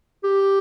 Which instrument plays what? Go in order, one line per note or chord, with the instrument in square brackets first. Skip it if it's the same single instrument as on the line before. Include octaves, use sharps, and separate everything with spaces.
[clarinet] G4